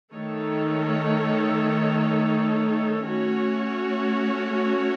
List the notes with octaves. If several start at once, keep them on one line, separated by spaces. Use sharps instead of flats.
D#3 A3 D#4 A4 C#5
A3 C#4 F#4 C#5